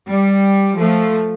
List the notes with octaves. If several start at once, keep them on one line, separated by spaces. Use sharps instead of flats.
G3
F3 A3